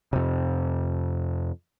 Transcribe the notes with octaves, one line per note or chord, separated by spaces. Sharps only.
F2 C3